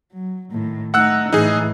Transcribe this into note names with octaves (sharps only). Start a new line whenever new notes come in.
F#3
A2 D#3
A3 D#4 F#5 E6 F#6
A2 E3 D#4 G#4